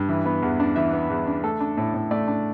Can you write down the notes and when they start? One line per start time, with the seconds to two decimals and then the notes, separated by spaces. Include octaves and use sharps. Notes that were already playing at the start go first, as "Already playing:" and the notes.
Already playing: G2
0.09 E3
0.26 B3
0.43 E2
0.60 D4
0.76 E3 E5
0.93 B3
1.10 E2
1.27 D4
1.43 A3 A4
1.60 D4
1.77 A2
1.94 A2
2.11 A3 D5
2.28 D4